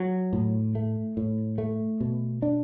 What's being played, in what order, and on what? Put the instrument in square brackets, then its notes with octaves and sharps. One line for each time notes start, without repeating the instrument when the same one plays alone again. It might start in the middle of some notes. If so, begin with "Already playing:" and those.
Already playing: [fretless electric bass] F#3
A2
A3
A2
A3
B2
D4